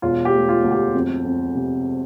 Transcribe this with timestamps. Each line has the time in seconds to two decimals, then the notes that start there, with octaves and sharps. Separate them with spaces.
0.02 E1 F4
0.25 G4
0.33 A3
0.49 F4
0.64 D2
0.71 G4
0.94 F2
1.25 F2
1.55 C3